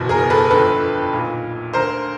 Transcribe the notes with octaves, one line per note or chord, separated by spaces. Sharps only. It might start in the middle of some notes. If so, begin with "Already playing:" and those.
Already playing: F#1 E2 B2
G#4 A#4
A4 B4
G1 F2 D3 A4 B4
B1 A#2
D2 D3 A#4 C5